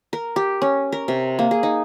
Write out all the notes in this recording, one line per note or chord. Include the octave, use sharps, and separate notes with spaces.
A#4
G4
C#4
A#4
C3
A#3
G#4
D#4